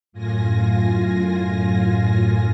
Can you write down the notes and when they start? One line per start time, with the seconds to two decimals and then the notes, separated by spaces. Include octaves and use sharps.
0.12 F#2 A2 F4 G#5 A#6